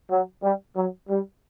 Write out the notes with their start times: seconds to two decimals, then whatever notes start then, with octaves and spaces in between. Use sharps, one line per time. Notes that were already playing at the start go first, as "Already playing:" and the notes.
0.11 F#3
0.43 G3
0.76 F#3
1.09 G3